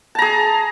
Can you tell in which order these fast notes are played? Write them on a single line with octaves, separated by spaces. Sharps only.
A5 A#5 G#4